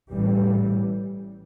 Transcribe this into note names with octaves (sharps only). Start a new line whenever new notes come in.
A1 A2 E3 G3